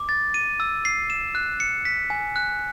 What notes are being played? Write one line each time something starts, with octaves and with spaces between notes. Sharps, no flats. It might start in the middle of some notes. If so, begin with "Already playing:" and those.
Already playing: D6
A6
D#7
E6
C7
E7
F#6
C#7
B6
G#5
F#6